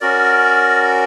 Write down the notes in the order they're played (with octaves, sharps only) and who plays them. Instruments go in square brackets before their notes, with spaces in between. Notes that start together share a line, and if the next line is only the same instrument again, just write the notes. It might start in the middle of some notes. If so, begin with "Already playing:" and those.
[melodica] C#4 F#4 A#4 D5